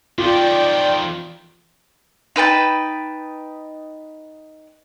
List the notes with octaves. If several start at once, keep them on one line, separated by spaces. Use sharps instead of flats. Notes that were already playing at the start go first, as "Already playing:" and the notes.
F2 D#3 F4 D5 G5
D#4 B4 G5 A5